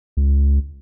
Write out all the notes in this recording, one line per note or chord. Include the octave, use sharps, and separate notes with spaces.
C#2